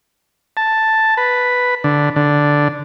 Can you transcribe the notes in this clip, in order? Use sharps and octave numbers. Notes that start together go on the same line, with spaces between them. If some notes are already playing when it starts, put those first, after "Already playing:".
A5
B4
D3
D3